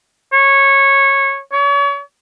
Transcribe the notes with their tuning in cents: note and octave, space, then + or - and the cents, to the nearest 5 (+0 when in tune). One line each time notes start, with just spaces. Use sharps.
C#5 -15
C#5 +35